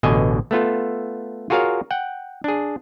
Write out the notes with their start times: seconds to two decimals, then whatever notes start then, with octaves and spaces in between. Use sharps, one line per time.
0.03 A1 B2 D3 D#5 G#5
0.51 A3 B3 F4 A4
1.50 F4 F#4 G#4 A#4 C#5 F5
1.91 F#5 G5
2.44 D4 G#4